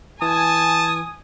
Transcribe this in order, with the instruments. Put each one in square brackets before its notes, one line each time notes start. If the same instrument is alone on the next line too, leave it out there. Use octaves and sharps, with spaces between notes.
[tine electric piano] E3 [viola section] G#5 [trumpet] A5 [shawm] D#6